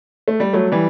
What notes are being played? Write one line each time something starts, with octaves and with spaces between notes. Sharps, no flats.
A3
G3
F#3 A3
E3 G3